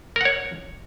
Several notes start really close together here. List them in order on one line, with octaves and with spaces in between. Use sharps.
A#4 F#5 C#5